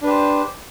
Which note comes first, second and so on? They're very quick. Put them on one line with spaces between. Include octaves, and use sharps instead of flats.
D4 B4 G4 C5